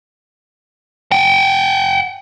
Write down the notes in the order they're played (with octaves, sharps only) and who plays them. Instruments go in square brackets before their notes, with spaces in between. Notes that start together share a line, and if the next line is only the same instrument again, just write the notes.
[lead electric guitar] F#5 G5